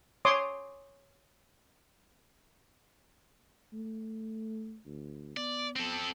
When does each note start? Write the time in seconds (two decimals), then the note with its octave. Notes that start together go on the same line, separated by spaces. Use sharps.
0.25 C#5 C6 D6 D#6
3.73 A3
4.85 D2
5.37 B3 D5
5.76 C4 A4